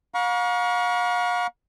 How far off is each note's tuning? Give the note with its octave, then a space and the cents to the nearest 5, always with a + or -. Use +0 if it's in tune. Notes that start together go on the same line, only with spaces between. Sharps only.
F5 +45 A#5 +45 C#6 +25